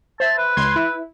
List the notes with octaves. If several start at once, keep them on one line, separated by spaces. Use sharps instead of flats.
C5 E5 A5
B4
C#2 C6 G#6
E4